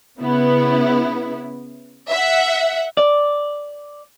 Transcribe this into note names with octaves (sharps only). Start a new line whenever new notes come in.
C#3 B3 E4
E5 F#5
D5